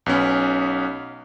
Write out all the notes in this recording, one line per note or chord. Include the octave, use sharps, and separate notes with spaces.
B1 B3 C#4